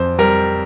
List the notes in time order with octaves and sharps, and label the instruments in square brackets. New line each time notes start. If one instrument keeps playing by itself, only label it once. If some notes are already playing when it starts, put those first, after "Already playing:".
Already playing: [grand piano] F2 C5
G3 A#4